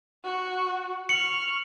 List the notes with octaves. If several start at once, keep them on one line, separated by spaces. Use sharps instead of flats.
F#4
C#6 F6 C#7 F#7